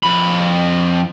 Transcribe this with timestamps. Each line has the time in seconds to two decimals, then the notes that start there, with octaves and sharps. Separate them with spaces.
0.03 F2 B5